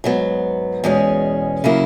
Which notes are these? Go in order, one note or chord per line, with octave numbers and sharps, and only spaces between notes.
G#2 F#3 B3
E2 B2 G#3 C#4
C#3 F#3 A#3 E4